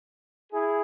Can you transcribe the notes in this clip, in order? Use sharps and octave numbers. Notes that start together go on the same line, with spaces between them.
E4 G#4